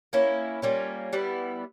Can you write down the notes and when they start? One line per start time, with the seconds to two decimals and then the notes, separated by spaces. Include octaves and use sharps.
0.13 A#3 C#4 E4
0.62 G3 A#3 C#4 F4
1.13 G3 B3 E4